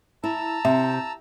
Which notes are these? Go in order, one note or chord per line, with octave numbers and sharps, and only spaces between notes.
E4 A5 A#5 E6
C3 E5